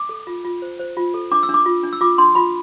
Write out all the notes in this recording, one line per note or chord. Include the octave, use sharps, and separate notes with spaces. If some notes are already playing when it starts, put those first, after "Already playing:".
Already playing: D6
A4
F4
F4
C5
C5
F4
A4
D4 D6
E6
D4
D6
F4
D4
E6
F4 D6
D4 C6
F4 B5